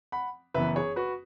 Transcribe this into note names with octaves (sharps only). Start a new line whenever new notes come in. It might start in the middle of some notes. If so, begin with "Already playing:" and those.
F#5 B5
F#1 F#2 E3 B3 B4 E5
G#4 C#5
F#4 B4